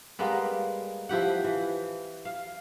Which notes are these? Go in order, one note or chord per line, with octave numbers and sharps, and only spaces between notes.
G3 G#3 A#3 B3
F3 E4 G4 F#5
E3
F5